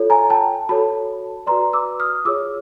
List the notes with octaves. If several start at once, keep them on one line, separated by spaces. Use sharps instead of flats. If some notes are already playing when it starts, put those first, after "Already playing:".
Already playing: F4 A4 C#5
G#5 A#5
G5 A5
F#4 A4 C#5 A5 B5
F#4 B4 D5 A#5 C6
D6 E6
D#6 F6
F4 G#4 C#5 D6 E6